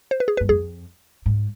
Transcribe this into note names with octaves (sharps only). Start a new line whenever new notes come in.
C5
B4
G#4
B4
G2
F2 G#4
G#2